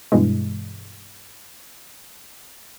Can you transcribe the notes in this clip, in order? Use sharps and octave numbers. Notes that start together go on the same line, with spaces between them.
G2 B2 E3 G#3